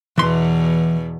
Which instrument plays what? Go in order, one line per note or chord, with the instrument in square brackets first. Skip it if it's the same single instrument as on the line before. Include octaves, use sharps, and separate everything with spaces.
[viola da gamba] E2 B2 [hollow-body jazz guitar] E3 C6